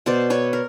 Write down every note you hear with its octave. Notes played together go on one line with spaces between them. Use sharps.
B2 C5 D5
B4 C#5
A#4